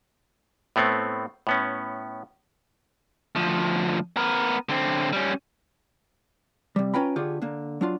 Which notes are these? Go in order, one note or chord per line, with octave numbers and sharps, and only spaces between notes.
A2 A3 B3 C4
A2 B3 C#4
D2 F3
B3 A#4
D3 C4
G3 C#4
C3 G3
C#4 F4 B4 G5 A#5 B5
D3 F4 G4 G#4 C#5
D3 A#3
F#3 D4 F4